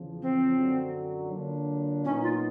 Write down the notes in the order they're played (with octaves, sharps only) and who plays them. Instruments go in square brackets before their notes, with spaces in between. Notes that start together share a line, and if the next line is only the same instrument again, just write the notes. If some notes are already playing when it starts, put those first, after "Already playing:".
Already playing: [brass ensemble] E2 C#3 F3
[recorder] C4
[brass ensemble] F#2 D3 F#3
D3 F#3 A#3 D4 F4
[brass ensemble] A#2 F#3 B3 D#4 [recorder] C#4
[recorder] F4